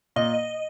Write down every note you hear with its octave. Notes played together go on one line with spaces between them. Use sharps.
A#2 D#5